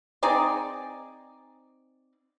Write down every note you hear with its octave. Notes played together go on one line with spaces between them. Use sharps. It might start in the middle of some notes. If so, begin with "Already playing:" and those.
C4 D#4 G#4 D5